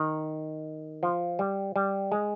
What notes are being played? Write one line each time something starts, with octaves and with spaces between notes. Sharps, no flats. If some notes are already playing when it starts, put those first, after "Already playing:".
Already playing: D#3
F3
G3
G3
G#3